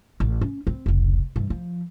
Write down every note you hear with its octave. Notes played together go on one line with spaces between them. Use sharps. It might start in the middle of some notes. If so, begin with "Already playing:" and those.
A1
C#4
C4
F1 C#2
G2 E3
F3